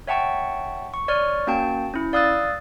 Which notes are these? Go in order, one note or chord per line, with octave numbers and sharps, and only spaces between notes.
C#5 E5 F#5 G5 A5 C#6
C#6
C#5 D5 C#6 F6
A#3 C#4 F#4 G5 A5
C#4 E4
D5 F5 D#6 E6 F#6 A6